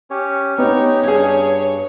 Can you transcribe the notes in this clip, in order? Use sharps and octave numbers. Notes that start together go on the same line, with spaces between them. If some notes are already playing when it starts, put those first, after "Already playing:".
C#4 G4 C#5
B3 D#4 G4 C#5
G2 C#4 G#4